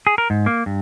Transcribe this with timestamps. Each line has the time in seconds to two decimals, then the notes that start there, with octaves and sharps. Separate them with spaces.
0.07 G#4
0.18 A#4
0.30 G#2
0.46 A#3
0.66 G2